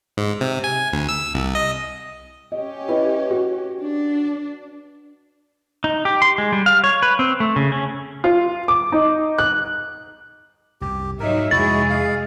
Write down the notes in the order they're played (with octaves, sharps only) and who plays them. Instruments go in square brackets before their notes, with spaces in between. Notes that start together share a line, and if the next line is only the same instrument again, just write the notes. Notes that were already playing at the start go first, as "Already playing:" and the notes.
[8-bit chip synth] G#2
C3
G#5
D2
E6
C2
D#5
[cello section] C#4 G4 [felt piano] D#5
[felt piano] E4 [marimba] B4 D#5
[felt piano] F#4
[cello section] D4
[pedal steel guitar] D#4
G4
C6
G#3
G3
F5
C#5
B4
C4
A3
C#3
C#4
[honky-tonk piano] F4
D6
D#4
F#6
[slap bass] C2 F#2 [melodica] G4
[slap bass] G#2 [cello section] F#3 D#4 E5 [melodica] A#4
[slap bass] F2 C3 A#3 [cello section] G#3 G#4 [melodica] E4 F#4 [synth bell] A6
[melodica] F5